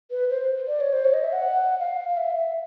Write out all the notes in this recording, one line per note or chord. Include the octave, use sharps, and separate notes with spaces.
B4
C5
D5
C#5
C5
C#5
D#5
E5
F#5
F5
F5
E5
E5